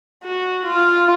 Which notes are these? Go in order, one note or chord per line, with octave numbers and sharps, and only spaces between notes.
F#4
F4